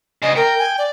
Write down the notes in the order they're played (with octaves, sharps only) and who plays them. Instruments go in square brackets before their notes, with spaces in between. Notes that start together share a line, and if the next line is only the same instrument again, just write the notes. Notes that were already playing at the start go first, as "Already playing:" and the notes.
[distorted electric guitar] D2 C#3 [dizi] D#5
[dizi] A#4 [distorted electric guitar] G5
[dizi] G#5
D5